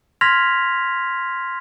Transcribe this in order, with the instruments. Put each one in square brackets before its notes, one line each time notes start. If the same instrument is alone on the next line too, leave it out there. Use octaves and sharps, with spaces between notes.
[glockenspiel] C6 F6 G#6 A#6 B6 F7